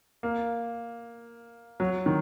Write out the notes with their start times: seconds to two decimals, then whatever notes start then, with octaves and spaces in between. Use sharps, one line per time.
0.23 A#3
1.80 F#3
2.06 D#3